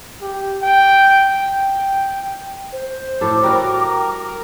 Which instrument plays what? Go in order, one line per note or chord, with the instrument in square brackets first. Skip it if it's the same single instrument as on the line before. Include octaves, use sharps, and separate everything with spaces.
[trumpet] G4
G5
G5
[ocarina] C5
[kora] A2 A4 [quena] D6
[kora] G3 F#4 [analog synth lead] A#4 [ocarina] G5